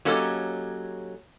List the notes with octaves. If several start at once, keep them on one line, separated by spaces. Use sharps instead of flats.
F#3 A#3 C#4 D#4 G4 A4